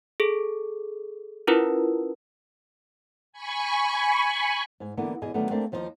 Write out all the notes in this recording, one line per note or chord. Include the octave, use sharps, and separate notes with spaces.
G#4 A4
C#4 E4 F4 A#4 B4
G#5 B5 C#6
G#2 G#5
D3 E3 A#3 B3
E2 B2 G#4 D#5 G#5
D3 D#3 F#3 G3 A3 B3
A3 A#3 C4 D4
D#2 F3 D#4 A4 C5 D#5